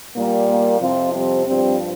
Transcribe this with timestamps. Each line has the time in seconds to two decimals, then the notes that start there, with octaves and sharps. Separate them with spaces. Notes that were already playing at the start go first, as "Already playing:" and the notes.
0.15 A#2 G3 A#3
0.49 A#3
0.80 F2 C3 F3 C4 F4
1.13 G3 C4
1.46 G2 F3 G3 C4